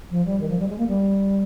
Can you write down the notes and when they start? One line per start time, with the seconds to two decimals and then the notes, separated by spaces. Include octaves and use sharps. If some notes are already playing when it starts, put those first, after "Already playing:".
0.11 F3
0.26 G3
0.40 D#3
0.49 F3
0.59 G3
0.68 G#3
0.78 A#3
0.88 G3